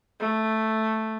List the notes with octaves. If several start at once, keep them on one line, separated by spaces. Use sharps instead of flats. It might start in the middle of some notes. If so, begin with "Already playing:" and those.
A3